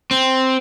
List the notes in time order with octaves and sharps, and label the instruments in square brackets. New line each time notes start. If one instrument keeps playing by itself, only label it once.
[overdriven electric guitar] C4